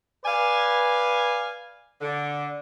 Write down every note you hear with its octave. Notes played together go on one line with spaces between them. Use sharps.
B4 D5 F5 G#5
D3